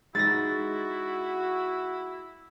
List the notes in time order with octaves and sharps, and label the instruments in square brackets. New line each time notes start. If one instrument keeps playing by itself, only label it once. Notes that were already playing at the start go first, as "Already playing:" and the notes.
[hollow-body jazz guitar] G#3 D#4 [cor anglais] E4 [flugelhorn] F#4 [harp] A6 A#6